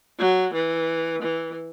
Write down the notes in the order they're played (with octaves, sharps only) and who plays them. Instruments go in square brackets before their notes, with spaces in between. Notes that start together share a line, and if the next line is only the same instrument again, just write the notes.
[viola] F#3
E3
E3